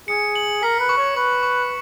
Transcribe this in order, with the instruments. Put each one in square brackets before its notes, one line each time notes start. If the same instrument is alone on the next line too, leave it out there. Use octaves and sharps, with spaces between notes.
[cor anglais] G#4 [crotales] C#7
[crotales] F#7
[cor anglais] A#4 [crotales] B6
[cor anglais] B4
[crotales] C#6
[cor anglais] C#5
[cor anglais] B4 [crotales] C#6
[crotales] C#6